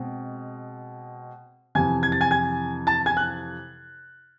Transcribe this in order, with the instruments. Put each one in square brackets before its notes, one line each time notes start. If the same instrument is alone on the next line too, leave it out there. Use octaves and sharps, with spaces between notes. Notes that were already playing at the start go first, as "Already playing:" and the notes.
Already playing: [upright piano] B2 G#3 C4
F2 C3 E3 G#5 G#6
G#6
A6
G#5 G#6
G#5 G#6
A5 A6
G#5 G#6
F#6